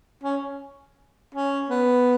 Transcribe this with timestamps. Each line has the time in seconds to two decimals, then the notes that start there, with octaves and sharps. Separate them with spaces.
0.24 C#4
1.35 C#4
1.70 B3